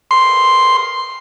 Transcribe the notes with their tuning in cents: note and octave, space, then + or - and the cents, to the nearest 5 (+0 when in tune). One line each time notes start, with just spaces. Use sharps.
C6 +0